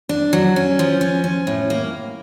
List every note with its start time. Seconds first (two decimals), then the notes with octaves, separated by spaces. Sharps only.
0.09 D4
0.33 F#3
0.56 C#4
0.79 F3
1.01 C#4
1.24 C#4
1.47 A2
1.70 A#3